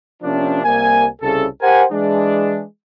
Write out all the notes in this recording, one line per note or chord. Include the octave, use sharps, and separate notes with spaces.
C3 F3 A#3 C#4 D4
C2 A#3 G#5
C2 C#3 A4
G4 A#4 C5 F#5 G#5
E3 G#3 D4